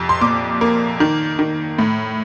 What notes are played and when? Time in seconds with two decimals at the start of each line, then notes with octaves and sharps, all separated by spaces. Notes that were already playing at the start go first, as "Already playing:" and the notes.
Already playing: F2 C3
0.09 C6
0.21 A#2 D6
0.61 A#3
1.00 D#3
1.39 D#3
1.79 A2